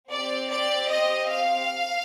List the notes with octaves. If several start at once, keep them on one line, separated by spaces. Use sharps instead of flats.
C4 G4 D5
D5
D#5
F5